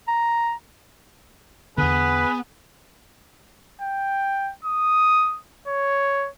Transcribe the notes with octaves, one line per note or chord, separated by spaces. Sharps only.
A#5
E2 D3 B3 G#4 B4
G5
D#6
C#5